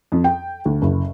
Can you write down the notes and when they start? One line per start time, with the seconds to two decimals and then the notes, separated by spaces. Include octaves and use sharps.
0.12 F2
0.24 G5
0.65 D2
0.82 F#1